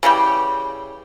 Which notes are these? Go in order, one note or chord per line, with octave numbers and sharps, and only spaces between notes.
C#3 E3 G3 G5